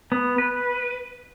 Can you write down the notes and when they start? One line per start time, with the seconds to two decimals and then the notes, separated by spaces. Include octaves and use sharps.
0.12 B3
0.38 B4